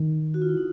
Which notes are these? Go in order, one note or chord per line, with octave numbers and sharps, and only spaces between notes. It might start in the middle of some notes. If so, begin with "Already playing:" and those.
Already playing: D#3
F#4
F4
E4
D#4